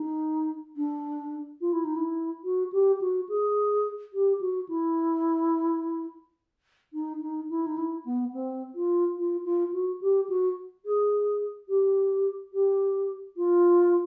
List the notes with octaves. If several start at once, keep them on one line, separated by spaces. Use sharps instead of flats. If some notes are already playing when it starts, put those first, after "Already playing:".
Already playing: D#4
D4
F4
E4
D#4
E4
F#4
G4
F#4
G#4
G4
F#4
E4
D#4
D#4
E4
D#4
E4
B3
C4
F4
F4
F4
F#4
G4
F#4
G#4
G4
G4
F4